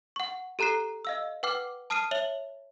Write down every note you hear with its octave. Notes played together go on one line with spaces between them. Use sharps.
F#5 C#6
G4 A4 A#5 F#6 C7
D#5 F5 E6
B4 F#5 G5 D6 F6
A5 D#6 F6 C7 D#7
C#5 E5 F7 F#7